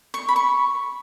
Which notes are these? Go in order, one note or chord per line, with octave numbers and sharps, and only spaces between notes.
C#6
B5
C#6